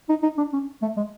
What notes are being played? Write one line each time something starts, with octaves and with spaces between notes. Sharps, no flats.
D#4
D#4
D4
C#4
A3
G#3